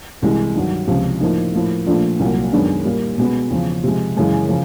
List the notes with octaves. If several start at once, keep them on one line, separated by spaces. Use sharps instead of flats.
C2 C3 E3 G#3
G2 D#3 F#3
C#2 C3 F3
A2 F3 A#3 D#4
A2 F3 A#3
A#2 F3 A3 D4 F4
C2 A#2 F#3
F#2 D#3 G#3 B3 D4
A#2 G3 A#3
B2 G#3 B3
E2 C#3 F3
C3 F3 G#3
F#2 C#3 E3 G#3
C#3 F3